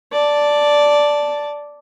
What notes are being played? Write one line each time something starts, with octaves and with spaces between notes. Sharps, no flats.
D5 A5